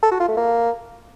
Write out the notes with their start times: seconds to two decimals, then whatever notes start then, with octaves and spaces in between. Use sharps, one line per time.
0.03 A4
0.11 F#4
0.20 F4
0.28 A3
0.37 A#3